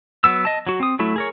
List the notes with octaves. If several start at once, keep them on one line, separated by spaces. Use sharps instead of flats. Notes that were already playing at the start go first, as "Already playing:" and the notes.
F#3 B3 E6
D#5 A5
F#3 F#4
C4 D#6
F#3 A3 E4
G#4 A#4 C#5